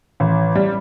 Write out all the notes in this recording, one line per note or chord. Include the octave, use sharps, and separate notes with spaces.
A1
G3